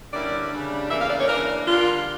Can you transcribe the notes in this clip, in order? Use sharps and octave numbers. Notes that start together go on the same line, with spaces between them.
D3 G3 A#3 C#4 E4 D5
C#3 G3 D4
E2 C#3 E3 A#3 E5
F5
D5
C#5
C#3 E3 A#3 D4 A#4
D3 G3 A#3 F4